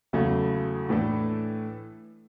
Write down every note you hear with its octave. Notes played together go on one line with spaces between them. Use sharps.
E2 C#3 F#3 A3
A2 E3 A3 D4 A4